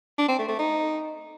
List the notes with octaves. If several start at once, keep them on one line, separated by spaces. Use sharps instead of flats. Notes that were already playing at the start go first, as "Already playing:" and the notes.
D4
C4
A3
A3
D#4